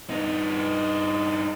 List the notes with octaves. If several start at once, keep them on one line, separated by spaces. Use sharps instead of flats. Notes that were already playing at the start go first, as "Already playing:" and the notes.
G2 D#4